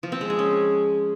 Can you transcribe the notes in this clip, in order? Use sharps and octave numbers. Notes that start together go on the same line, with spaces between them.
F3
C4
G#3
G#4
C#4